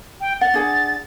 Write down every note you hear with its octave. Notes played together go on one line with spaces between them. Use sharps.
G5
F#5 A6
D4 G#4 F#5